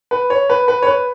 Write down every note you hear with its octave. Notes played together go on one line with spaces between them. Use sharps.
B4
C#5
B4
B4
C#5
B4